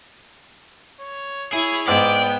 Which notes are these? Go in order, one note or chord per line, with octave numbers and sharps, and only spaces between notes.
C#5
E4 G#4 C#5
G#2 B3 D5 G5